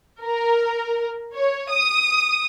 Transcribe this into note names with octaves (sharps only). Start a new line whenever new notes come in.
A#4
C#5
D#6